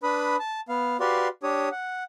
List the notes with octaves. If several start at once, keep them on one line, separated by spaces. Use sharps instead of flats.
D4 B4 B5 D#6
A5
B3 F5
F#4 G4 B4 D5 F5 C6
D4 G4 C#5 D#6
F#5